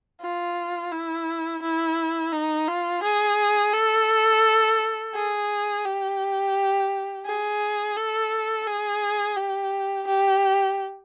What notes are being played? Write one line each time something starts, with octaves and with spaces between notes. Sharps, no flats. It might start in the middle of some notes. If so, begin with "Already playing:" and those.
F4
E4
E4
D#4
F4
G#4
A4
G#4
G4
G#4
A4
G#4
G4
G4